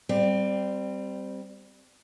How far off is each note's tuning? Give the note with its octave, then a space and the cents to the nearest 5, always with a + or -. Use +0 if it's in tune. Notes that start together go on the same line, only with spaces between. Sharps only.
G3 +0 C4 -10 D5 +20